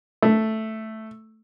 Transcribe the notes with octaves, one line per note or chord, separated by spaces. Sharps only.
A3